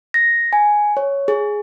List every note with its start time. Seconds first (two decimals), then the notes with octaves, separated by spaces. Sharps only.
0.14 A#6
0.53 G#5
0.97 C#5
1.28 G#4